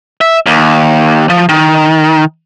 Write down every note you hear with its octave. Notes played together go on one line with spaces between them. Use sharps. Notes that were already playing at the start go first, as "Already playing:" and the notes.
E5
D#2
F3
D#3